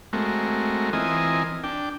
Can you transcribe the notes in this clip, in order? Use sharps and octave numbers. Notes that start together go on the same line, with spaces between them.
G#3 A3 C4 F#4 A#4
E3 C4 F4 A#4 D#5 G#5
D4 G5